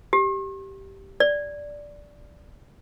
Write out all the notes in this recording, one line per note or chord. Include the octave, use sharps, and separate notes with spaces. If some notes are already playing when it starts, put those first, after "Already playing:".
G4
D5